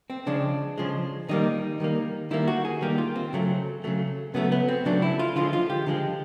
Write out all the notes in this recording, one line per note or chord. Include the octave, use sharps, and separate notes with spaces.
C4
C#3 F3 G#3 D4
C#3 F3 G#3
D#3 G3 A#3 D#4
D#3 G3 A#3
D#3 G3 A#3 E4
F#4
G#4
D#3 G3 A#3 G4
F4
C4
C#3 F#3 A3
C#3 F#3 A3
C#3 F#3 A3 B3
B3
C4
C#3 F#3 A3 D4
E4
F4
D3 F3 G#3 F4
F4
G4
D3 F3 G#3